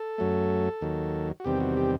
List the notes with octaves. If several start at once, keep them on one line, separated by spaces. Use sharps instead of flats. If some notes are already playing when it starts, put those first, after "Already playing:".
Already playing: A4
F#2 F#3 A3
D#2 D#3 F#3
F#4
E2 C3 D#3 G3 C4 G4
F#4
G4